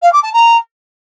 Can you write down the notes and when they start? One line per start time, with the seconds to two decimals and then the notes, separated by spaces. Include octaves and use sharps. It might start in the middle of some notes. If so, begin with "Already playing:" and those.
0.02 F5
0.12 D6
0.23 A5
0.33 A#5